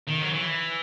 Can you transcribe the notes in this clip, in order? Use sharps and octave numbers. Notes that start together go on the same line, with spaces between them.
D#3
F#3
E3